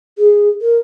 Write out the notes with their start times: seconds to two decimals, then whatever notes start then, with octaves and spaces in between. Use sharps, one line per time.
0.18 G#4
0.61 A#4